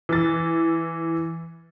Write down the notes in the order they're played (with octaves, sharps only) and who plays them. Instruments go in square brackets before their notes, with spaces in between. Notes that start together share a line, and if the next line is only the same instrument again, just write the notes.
[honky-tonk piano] E3 A6